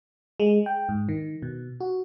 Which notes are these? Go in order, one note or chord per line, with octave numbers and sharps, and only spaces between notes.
G#3
G5
G#2
D#3
B2
F#4